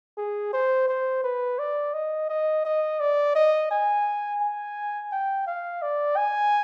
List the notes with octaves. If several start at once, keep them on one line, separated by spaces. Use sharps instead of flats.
G#4
C5
C5
B4
D5
D#5
D#5
D#5
D5
D#5
G#5
G#5
G5
F5
D5
G#5